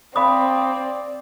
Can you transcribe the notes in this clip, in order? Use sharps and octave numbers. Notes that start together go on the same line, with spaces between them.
C4 D5 F5 B5 D#6